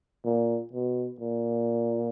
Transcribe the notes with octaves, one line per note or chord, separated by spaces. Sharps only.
A#2
B2
A#2